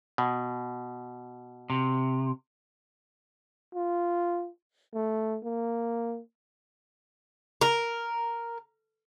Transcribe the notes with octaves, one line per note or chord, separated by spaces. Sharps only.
B2
C3
F4
A3
A#3
A#4